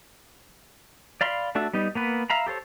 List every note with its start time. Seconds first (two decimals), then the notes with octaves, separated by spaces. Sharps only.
1.21 D5 F5 B5 C6
1.55 A3 D4 F#4 A4 E5
1.74 G3 B3 D#4
1.95 A#3 B3 B4
2.30 E5 F5 A#5 B5
2.47 G4 A4 C5 C#5